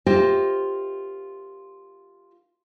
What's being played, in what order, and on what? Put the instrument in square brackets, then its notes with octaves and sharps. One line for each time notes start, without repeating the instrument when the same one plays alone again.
[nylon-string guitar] F4 G4 A#4 C5 D#5 E5